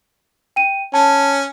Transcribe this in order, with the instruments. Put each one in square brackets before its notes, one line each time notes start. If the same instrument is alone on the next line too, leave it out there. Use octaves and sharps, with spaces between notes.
[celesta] G5 D#7
[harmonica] C#4 [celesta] A5